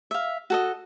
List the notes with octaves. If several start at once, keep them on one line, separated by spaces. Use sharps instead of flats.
E5 F5
F#4 A4 D#5